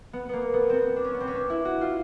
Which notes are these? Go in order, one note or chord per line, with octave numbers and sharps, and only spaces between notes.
B3
A#3 B3
B3
B3 C4
D4
C#4
B3
C4
C#4
D4
E4
F#4
F4